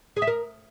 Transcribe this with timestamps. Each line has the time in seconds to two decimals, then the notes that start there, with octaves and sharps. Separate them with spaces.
0.16 G#4
0.22 E5
0.27 A#4